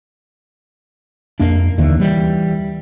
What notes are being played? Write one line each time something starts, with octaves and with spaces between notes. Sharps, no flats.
F2 A#3 D4
D#2 D3 E3 A#3
E3 G3